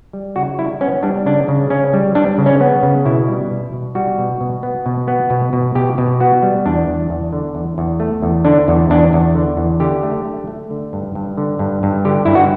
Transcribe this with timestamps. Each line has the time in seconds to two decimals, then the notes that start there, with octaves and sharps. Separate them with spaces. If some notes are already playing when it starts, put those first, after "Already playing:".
0.13 G3
0.36 C#3 F#4
0.59 G3 E4
0.81 B3 C#4
1.03 G3 D4
1.26 C#3 D4
1.48 C#3
1.70 C#3 C#4
1.93 G3
2.15 G3 D4
2.38 C#3
2.46 C#4
2.61 B3
2.83 C#3
3.05 B2 E4
3.28 G3
3.51 B2
3.73 B2
3.95 G3 F#4
4.18 B2
4.41 B2
4.63 B3
4.86 B2
5.08 B3
5.30 B2
5.53 B2
5.75 B2 G4
5.98 B2
6.20 B3 F#4
6.43 G3
6.66 E2 D4
6.88 E2
7.10 E2
7.33 D3
7.55 E2
7.78 E2
8.00 A3
8.22 E2
8.45 D3 D4
8.68 E2
8.90 E2 D4
9.13 E2
9.35 D3
9.57 E2
9.80 D3 G4
10.03 A3
10.25 A3
10.47 A3
10.70 D3
10.93 G2
11.15 G2
11.38 D3
11.59 G2
11.83 G2
12.05 D3 G4
12.25 G2 E4
12.35 F#4